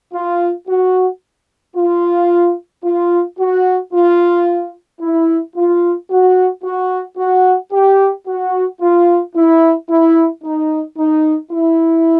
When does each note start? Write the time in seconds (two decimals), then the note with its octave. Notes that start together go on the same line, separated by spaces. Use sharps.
0.13 F4
0.68 F#4
1.76 F4
2.84 F4
3.39 F#4
3.93 F4
5.01 E4
5.55 F4
6.10 F#4
6.64 F#4
7.18 F#4
7.72 G4
8.27 F#4
8.81 F4
9.35 E4
9.89 E4
10.44 D#4
10.98 D#4
11.52 E4